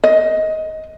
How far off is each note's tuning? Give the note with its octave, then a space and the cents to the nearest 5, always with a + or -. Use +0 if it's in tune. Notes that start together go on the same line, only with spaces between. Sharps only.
D#5 +15